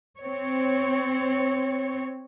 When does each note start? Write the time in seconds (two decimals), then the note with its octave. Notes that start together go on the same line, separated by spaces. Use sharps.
0.20 C4 C#5